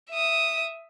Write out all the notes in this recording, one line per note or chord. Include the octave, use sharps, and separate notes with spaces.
E5 D#6